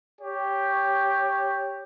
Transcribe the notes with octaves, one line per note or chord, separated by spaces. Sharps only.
G4 C#5